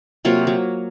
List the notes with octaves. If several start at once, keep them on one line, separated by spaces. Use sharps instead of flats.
C3 F#3 A#3 F4
F#3